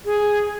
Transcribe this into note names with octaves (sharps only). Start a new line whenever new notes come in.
G#4